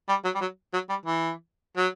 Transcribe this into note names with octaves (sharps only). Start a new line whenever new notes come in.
G3
F#3
G3
F#3
F#3
G3
E3
F#3